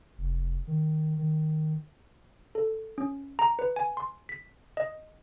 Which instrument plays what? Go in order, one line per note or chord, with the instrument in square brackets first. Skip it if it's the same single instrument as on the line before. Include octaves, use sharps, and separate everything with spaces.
[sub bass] F1
D#3
D#3
[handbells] A4
C#4
A#5
B4
G#5
C6
B6
D#5